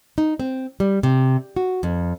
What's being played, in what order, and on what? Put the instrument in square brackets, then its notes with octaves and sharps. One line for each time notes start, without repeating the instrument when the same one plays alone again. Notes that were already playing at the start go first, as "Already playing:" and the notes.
[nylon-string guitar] D#4
C4
G3
C3
F#4
F2